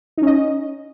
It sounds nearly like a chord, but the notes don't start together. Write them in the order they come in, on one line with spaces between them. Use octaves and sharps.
D#4 C#4 D#5